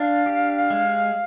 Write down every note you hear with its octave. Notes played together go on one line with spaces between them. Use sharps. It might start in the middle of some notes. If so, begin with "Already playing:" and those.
Already playing: D4 F5
G4
G#3